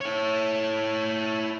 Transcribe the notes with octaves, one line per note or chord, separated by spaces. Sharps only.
E4 C#5